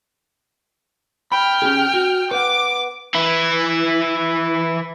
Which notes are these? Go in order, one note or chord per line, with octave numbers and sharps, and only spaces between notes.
G5 B5 F6
C#4 G4 G#4
F#4
B4 F#5 D6
E3 E4